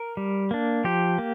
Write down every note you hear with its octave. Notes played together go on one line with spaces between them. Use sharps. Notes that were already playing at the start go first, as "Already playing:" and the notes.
Already playing: A#4
G3
A#3 D4
F3 G4
A#3